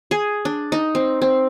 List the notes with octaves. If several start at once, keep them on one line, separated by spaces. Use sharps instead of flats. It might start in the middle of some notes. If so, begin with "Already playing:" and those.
G#4
D4
D#4
C4
C4